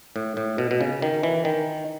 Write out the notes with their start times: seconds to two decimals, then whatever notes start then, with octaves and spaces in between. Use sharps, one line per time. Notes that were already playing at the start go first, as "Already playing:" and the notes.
0.16 A2
0.37 A2
0.58 B2
0.71 B2
0.81 C#3
1.02 D#3
1.23 E3
1.45 D#3